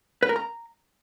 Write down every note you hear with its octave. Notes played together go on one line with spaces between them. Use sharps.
B4
A#4
A#5